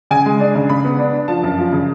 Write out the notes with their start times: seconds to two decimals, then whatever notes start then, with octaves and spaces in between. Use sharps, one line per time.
0.11 C#3 G#5
0.26 G#3
0.40 D4
0.55 C#3
0.69 C#3 B5
0.84 B3
0.99 D4
1.13 D4
1.28 F3 A5
1.43 F#2
1.58 F3
1.72 C#3